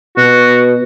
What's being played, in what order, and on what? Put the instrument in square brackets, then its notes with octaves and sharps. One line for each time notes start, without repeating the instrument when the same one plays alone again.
[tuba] B2 [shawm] F#4